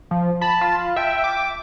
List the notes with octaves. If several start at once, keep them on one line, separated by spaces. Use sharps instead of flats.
F3
A5 B5
F4
E5 G5
D6